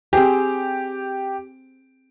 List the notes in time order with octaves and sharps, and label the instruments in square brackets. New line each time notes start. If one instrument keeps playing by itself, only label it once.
[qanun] C4 G#4 [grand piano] G4